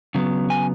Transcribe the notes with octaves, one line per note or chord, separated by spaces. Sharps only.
C#3 F#3 B3
G#5